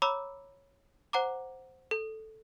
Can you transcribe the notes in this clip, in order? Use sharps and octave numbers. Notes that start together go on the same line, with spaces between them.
C#5 A#5 B5 D6 E6
C5 F#5 A#5 D6
A4